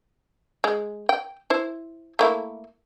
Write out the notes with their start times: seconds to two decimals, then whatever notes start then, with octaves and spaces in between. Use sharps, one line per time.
0.64 G#3
1.09 G5
1.50 E4 C5
2.19 A3 A#3 E4